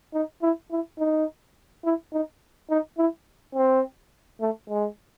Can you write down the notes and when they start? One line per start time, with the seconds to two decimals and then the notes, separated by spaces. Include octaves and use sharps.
0.14 D#4
0.42 E4
0.71 E4
0.99 D#4
1.84 E4
2.13 D#4
2.70 D#4
2.98 E4
3.55 C4
4.41 A3
4.69 G#3